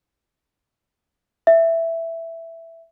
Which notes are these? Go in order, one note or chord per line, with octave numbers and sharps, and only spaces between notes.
E5